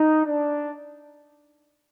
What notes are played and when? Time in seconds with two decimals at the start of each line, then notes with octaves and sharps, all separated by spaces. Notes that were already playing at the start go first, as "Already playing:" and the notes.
Already playing: D#4
0.25 D4